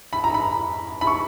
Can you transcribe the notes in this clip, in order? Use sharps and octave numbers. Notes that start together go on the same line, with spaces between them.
B5
A#5
B5
B5
C#6